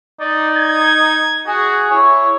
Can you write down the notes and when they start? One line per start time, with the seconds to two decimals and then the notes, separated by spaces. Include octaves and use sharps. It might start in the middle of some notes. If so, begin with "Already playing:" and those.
0.20 D#4 D5
0.56 G#6
1.47 F#4 G#4
1.91 E4 C#5